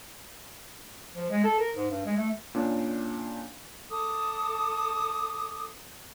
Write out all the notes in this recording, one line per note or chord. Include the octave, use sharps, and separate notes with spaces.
F3
G#3
A4
A#4
G#2
G2
G#3
A3
A#2 C#4 D4
A4 D6 D#6